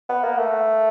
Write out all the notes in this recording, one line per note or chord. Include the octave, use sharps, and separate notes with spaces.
B3
A#3
A3